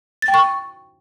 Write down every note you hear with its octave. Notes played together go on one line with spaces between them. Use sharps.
A6
G5
C#6